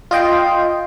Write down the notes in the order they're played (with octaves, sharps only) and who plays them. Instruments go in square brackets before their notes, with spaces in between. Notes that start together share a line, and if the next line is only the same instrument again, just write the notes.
[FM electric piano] F4 D#5 G5 C6